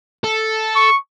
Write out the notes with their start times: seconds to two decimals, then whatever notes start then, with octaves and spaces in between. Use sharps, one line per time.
0.24 A4
0.76 C#6